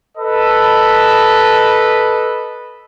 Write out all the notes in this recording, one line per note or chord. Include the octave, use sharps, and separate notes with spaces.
A4 B4 D#5